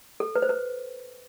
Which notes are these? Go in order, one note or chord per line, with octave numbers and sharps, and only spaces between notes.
A4
B4
C5
B4